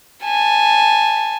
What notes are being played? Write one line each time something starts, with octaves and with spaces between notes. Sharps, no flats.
G#5 A5